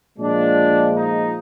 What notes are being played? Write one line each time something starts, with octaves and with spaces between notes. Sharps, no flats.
A#2 F3 G#3 D4
D#4